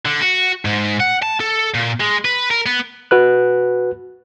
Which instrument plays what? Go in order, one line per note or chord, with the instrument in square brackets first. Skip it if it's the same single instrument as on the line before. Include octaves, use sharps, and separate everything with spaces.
[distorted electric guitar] D3
F#4
G#2
F#5
A5
A4
A#2
G#3
B4
A#4
B3
[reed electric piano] F#4 B4 F#6